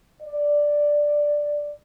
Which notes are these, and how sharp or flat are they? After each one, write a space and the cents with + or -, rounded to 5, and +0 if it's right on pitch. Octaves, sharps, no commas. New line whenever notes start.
D5 +0